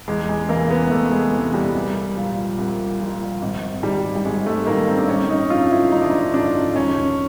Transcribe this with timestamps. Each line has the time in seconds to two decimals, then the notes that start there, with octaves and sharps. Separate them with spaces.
0.08 E2 G#3
0.29 G#3
0.49 C3 E3 A#3
0.71 B3
0.91 E2 A3
1.12 G#3
1.33 C3 E3
1.54 G3
1.75 C2
2.16 A#2 F3
2.58 C2
3.00 A#2 F3
3.42 G#1
3.83 G#2 D#3 G3
4.16 G3
4.25 G#1 G#3
4.46 A3
4.67 G#2 D#3 A#3
4.88 C4
4.98 D4
5.08 G#1 C#4
5.30 D#4
5.50 F#2 D3 F3 F4
5.72 E4
5.92 G#1 D#4
6.01 D4
6.10 D#4
6.34 F#2 D3 F3 D4
6.76 E1 C#4